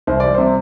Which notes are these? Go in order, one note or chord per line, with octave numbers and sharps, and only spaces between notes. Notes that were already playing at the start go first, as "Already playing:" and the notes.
C2 C5
G3 D5
C5
C3